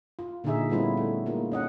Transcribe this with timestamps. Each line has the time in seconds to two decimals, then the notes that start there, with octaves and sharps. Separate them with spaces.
0.19 F4
0.44 A#2 D3 D#3 D#4 G#4 E5
0.70 G3 A3 B3 C#4 E4 F4
0.97 A3
1.26 G#3 A#3 D#4 F4
1.52 C#4 D#5 F#5